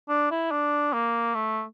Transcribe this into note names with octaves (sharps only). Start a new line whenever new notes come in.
D4
E4
D4
A#3
A3